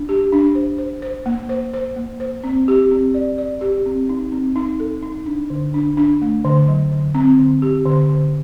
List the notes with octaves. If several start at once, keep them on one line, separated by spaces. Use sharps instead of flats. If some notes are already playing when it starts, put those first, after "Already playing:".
Already playing: D4
G4
D4
C5
C5
C5
A#3
C5
C5
A#3
C5
C4
G4
C4
D5
D5
G4
C4
D#4
C4
D#4
A4
D#4
D4
D3
D4
D4
A3
D3
F#3
D3
C4
D3
G4
D3
D3